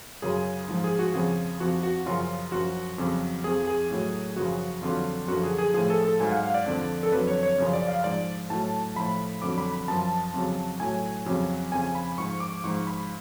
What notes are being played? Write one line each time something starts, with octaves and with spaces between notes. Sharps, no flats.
F#2 C#3 F#3 G#4
G#2 F3
G#4
F#4
F2 C#3 F3 G#4
F2 F3 F#4
F#4
F#2 C#3 F3 F4
F#2 F3 F#4
F2 C#3 F#3
F2 F3 G#4
G#4
A2 F#3
F#2 C#3 F3 F#4
F2 D3 F#3 F4
F#2 D3 F3 F#4
G#4
G#4
A2 F3 G#4
A4
A4
G#2 F#3 G#5
F5
F#5
F5
D5
F2 D3 F3
A4
F2 D3 F#3 B4
C#5
C#5
F#2 C#3 F3
D5
F5
G#2 F3 D5
A2 F#3 A5
A2 F3 B5
F2 D3 F#3 D6
B5
B5
F#2 F3 A5
F2 C#3 F#3
A2 F#3 G#5
F2 C#3 F#3
F2 C#3 F3 G#5
B5
G#2 F3 C#6
D6
G#2 F3 C#6
B5